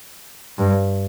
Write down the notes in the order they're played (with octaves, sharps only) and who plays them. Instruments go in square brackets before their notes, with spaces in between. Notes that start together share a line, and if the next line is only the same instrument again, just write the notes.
[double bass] G2